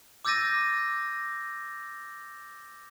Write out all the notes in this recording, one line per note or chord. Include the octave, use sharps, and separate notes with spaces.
D6 E6 G6 A6 A#6 D#7